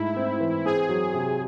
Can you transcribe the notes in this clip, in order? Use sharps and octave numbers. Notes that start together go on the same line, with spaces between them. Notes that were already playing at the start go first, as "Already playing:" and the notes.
Already playing: G#2 A3 E4
C4
E3
C4 G#4
F#3
C3